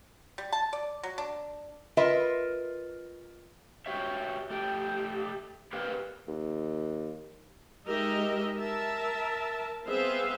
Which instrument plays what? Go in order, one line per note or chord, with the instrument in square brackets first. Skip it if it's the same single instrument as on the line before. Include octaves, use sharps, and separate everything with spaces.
[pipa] G3
A5
D5
F#3
D4
[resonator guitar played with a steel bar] F4 A#4 B4 D#5 E5
[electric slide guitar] F#4 G4 C#5 E5
A3 G4
G4 A#4 B4 D5 F5 F#5
[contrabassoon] D#2
[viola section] G#3 D#4 G4 A#4 D#5 E5
A#4 E5 A5
B3 C4 G#4 C5 E5 F5